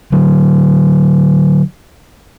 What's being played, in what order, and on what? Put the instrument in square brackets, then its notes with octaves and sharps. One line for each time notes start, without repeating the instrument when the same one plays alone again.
[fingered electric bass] D3 F#3